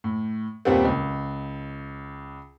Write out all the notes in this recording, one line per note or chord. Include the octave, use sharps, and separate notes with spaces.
A2
D#2 A#2 G3 B3 C4
C#2